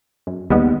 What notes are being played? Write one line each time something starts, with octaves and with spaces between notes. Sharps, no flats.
F#2
D#2 G3 G#3 B3